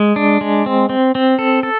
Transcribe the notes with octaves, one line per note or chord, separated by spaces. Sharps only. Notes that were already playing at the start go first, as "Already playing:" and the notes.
Already playing: G#3
D4
G#3
C4
C4
C4
A4
A4